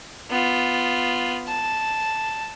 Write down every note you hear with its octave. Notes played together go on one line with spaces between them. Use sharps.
B3 F4
A5